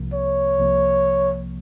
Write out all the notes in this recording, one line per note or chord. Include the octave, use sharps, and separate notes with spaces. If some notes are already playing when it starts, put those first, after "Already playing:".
Already playing: C2 C3 F3 A#3
C#5
C2 C3 F3 A#3